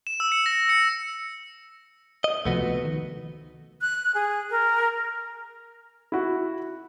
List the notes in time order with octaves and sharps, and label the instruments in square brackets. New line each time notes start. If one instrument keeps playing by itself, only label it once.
[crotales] E7
E6
C#7
A#6
C#7
[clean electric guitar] D#5
[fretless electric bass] C#2 C3 F3 [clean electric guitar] A3 B3 F#4
[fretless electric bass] D#3
[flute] F#6
G#4
A#4
[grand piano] E4 F#4